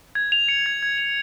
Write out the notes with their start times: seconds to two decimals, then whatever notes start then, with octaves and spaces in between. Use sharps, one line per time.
0.15 G#6
0.32 F7
0.48 C#7
0.66 G#6
0.83 G#6
0.98 F7